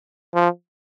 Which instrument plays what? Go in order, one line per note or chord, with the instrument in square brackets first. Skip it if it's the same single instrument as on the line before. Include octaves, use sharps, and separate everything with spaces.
[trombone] F3